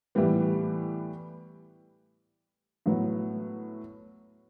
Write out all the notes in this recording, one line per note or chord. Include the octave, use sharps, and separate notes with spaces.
A2 E3 G3 B3
A2 F#3 B3